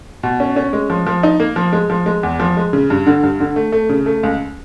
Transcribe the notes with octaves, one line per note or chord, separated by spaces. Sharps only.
B2
C#4
C#4
G#3
F3
F3
D#4
A#3
F3
G#3
F3
G#3
E2
F3
G#3
C#3
G2
D3
G2
D3
A3
A3
C#3
A3
C#2